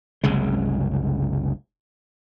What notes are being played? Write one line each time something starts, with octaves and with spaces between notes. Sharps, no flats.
F#1 C2 C#3 G#3